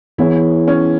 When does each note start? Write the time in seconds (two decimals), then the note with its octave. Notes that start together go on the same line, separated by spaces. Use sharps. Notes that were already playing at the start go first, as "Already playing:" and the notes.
0.18 E3 B3 E4 G#4 C#5
0.68 C#4